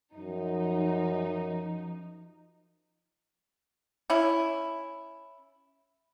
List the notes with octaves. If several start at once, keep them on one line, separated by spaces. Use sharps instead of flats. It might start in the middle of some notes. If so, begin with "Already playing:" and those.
F#2 F3 D#4
C#4 E4